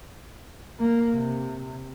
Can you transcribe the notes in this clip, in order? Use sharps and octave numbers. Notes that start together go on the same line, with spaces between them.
A#3
C3